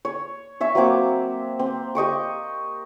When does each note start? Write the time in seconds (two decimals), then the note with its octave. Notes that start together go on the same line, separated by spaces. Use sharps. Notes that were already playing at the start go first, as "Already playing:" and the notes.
0.05 C#5
0.61 C#5 E5 C#6
0.75 F#3 A#3 C4 D6
1.59 C4
1.95 G4 D#5 C#6 D6